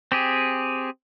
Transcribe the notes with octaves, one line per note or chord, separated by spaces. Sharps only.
C4 G4 G#4